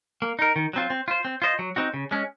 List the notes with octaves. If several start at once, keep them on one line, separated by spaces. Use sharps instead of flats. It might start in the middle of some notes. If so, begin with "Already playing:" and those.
A#3
D#4 A#4
D#3
F#3 C4 F4
C4
F4 C5
C4
F4 C5 D#5
F#3
C4 D#4 F#4
C#3
G#3 C#4